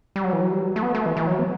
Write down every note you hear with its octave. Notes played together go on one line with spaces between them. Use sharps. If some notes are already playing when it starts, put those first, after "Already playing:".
G3
F#3
E3
F#3
G3
F#3
A3
B3
A3
E3
E3
F#3
B3